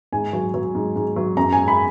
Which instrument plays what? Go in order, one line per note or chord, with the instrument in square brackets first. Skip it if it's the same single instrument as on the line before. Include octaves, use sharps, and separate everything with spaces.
[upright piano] G#2 G#5
F#3
F#3
G#2
G#2
F#3
F#2 A#5
G#5
G#3
B5